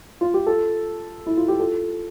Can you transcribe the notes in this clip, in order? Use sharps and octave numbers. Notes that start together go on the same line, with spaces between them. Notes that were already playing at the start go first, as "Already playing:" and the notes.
F4
G4
F4 A4
E4
F4
G4
F4 A4